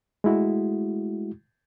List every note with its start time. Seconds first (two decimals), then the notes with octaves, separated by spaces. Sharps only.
0.24 G#3 A3 E4 F#4